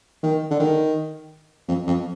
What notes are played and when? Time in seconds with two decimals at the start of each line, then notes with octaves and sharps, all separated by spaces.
0.23 D#3
0.51 D3
0.59 D#3
1.68 F2
1.87 F2